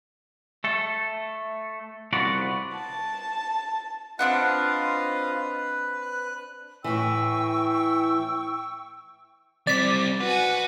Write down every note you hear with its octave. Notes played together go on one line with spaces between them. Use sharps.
A3 A4
C2 F3 B3 F#4 D5
A5
C4 D4 F4 B4 D#5 F5 F#5
F#6
A2 E3 G5 C#6 E6
G3 C4 D5 B6
F#4 B4 G#5